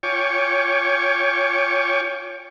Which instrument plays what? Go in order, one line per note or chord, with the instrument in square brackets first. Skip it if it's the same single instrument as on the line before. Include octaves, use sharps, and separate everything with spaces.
[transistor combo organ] F4 C#5 G5 G#5 C#6 D6